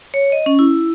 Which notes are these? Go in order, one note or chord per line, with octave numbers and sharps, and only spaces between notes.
C#5
D#5
C#4
E4